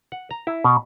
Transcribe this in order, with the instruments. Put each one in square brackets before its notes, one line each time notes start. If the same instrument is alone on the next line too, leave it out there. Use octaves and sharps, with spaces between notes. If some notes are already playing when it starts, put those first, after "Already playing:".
[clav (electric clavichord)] F#5
A#5
E4
B2